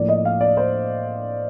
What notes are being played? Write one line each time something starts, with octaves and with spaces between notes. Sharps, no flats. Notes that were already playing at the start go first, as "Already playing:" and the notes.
Already playing: A2 F3 A#3 D5
D#5
F5
D5
C5